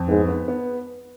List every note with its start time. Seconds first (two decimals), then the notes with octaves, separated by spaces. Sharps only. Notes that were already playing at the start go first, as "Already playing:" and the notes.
Already playing: F2
0.09 G#2 B3
0.28 B3
0.48 B3